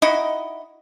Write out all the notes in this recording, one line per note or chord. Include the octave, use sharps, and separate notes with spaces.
D#4 E4 F#4 D#5